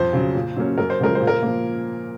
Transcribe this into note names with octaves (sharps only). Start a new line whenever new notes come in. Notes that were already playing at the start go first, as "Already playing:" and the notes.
Already playing: F2 C5
C#3 F#3
A#2
F#3 A#3 C#4
F#2 A#4
C5
C#3 F3 G#3 A#4
C5
A#2
A#4
F3 A#3